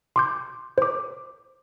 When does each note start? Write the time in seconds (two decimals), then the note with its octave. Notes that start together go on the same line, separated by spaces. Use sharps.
0.16 C6 D6 G6
0.78 C5 D6